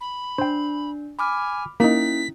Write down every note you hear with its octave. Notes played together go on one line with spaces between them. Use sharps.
B5
D4 C5 G5
G#5 B5 D6 F6
A#3 C#4 D#4 E4 B6